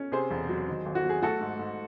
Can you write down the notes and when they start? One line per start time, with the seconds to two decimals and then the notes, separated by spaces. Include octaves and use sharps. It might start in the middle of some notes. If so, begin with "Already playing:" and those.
Already playing: C#4
0.12 C3 G#4 C5
0.31 E1
0.49 F#3
0.68 D#3
0.86 G#1
0.95 F#4
1.04 F#3
1.09 G#4
1.22 A3 F#4 A4
1.41 G#2
1.59 G#2